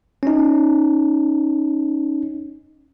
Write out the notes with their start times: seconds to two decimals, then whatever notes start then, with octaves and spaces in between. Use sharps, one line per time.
0.23 C#4 D#4